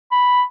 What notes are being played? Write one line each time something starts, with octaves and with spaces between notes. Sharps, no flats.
B5